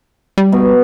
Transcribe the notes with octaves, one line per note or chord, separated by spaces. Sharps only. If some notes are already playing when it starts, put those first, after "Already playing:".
G3
B2